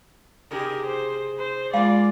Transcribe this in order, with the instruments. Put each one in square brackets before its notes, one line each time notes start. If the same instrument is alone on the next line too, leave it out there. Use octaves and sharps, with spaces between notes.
[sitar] C3 D#4 G#4 [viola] G4 A#4
[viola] C5
C5
[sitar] G#2 A#3 [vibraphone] G#3 [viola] F4 D5 [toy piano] F5